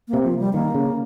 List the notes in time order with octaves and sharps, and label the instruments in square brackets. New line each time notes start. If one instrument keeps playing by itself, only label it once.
[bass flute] A#3
[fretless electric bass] C3
[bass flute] F3
G3
[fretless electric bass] D#3 [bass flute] A#3
[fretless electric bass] C#3